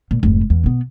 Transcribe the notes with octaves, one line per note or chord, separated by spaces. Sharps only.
A#2
F1 G#2
E2
B2 B3